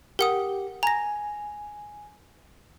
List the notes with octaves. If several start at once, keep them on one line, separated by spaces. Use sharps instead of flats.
G4 A#4 F#5 D#6
G#5 A#5 A#6